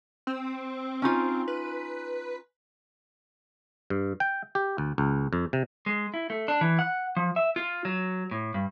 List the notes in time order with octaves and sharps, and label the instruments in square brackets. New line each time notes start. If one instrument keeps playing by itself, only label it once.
[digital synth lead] C4
[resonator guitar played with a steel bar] C#4 D#4 F4
[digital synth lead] B4
[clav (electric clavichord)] G2
G5
G4
D2
C#2
F2
C3
[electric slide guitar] G#3
E4
A3
D4
E3
F#5
F3
E5
F4
F#3
A2
G2